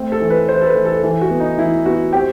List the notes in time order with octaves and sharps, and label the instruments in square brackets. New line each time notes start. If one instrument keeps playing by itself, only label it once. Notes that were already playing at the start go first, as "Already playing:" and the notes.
Already playing: [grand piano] A3 C4
A4
E3
B4
E3 C5
A4
B4
E3
A4
E3 A4
F#4
B3
D#4
E3 E4
B3 F#4
C4 G4